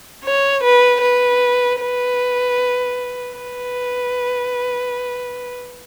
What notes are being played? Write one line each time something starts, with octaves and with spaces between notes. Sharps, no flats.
C#5
B4
B4
B4
B4